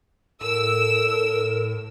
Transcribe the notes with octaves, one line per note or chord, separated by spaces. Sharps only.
A2 A4 A#4 E6